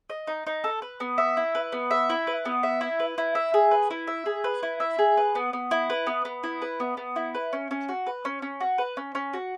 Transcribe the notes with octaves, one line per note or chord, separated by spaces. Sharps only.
D#5
D#4
D#4
A4
B4
B3
E5
E4
B4
B3
E5
E4
B4
B3
E5
E4
B4
E4
E5
G#4
B4
E4
E5
G#4
B4
E4
E5
G#4
B4
B3
B3
E4
B4
B3
B3
E4
B4
B3
B3
E4
B4
C#4
C#4
F#4
B4
C#4
C#4
F#4
B4
C#4
C#4
F#4